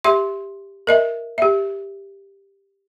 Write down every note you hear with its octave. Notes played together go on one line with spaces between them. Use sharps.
G4 E5 C6
A#4 D#5 E5
G4 E5